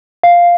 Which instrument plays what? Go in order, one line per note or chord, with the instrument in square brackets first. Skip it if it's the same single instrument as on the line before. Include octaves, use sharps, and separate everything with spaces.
[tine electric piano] F5